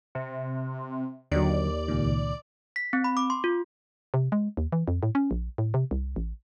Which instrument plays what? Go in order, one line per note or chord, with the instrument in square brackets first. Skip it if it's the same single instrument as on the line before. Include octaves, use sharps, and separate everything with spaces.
[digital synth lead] C3
[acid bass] D#2 [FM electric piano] D3 F#3 [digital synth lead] D5
[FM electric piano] C#2 A#2 D#3
[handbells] B6
C4
B5
D6
C6
F4
[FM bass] C3
G#3
D#2
E3
F2
A2
C#4
A#1
A2
C3
C2
A1